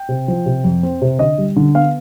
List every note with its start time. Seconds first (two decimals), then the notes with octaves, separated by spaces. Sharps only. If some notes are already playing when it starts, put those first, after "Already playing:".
Already playing: G5
0.09 C3
0.28 F3
0.46 C3
0.64 F2
0.83 C4
1.02 C3
1.19 D3 D#5
1.38 G3
1.56 D3
1.74 B3 F5